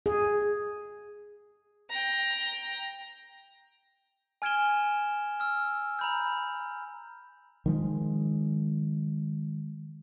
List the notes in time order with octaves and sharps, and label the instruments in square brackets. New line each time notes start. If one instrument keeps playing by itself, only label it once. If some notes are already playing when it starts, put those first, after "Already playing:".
[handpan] G#4
[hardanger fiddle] G5 A#5
[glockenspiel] G#5 F6 G#6 D7 E7 G7
E6 F6
A#5 B5 G6
[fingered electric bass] D#3 F3 G#3